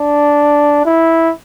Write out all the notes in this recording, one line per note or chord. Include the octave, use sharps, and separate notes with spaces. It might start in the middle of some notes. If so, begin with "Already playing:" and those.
Already playing: D4
E4